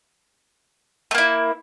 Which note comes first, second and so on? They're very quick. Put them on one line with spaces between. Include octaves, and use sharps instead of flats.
A3 A#3 E4